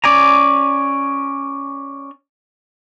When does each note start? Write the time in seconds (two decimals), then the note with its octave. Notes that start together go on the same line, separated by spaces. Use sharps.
0.04 C#4 D5 G#5 A#5